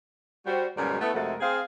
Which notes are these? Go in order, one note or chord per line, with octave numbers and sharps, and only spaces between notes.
G3 F#4 C5
G#2 B2 D#3 F#3 G3 C#4
A3 B3 E4
F2 C3 G#3 A3 F#4 A#4
C4 G#4 F5